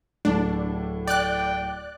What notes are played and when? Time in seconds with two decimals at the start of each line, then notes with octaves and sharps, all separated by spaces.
0.25 D1 A2 D4
1.07 D5 G5 F#6